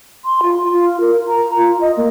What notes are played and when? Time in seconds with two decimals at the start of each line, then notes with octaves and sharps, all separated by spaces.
0.25 C6
0.43 F4
0.71 F4
1.00 A#4
1.28 A#5
1.57 F4
1.81 D#5
1.97 A#3